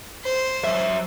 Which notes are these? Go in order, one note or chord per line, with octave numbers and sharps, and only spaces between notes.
C5
F#3 E5